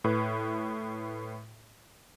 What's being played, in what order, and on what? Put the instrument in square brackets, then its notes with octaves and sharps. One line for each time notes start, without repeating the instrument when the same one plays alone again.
[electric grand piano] A2 B4